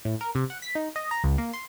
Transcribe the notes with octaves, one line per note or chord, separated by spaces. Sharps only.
A2
A#4
C3
F#5
B6
D#4
D#5
A#5
C#2
A#3
C6